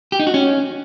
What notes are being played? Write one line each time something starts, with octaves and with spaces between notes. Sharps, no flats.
G4
D#4
F#4
C#4